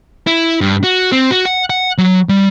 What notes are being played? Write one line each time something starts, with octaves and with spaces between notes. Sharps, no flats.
E4
G2
F#4
C4
F#4
F#5
F#5
F#3
G3